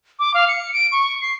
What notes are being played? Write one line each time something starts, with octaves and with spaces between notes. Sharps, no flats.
D6
F5
C#7
D7
C#6
C7